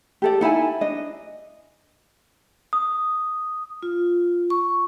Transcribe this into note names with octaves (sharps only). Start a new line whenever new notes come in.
G4 A4 D5
D#4 E4 E5 G#5
D4 D#5
D#6
F4
C#6